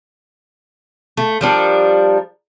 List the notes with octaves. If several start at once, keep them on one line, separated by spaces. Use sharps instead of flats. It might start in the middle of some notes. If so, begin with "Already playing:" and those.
A3
F3 G3 D4 A#4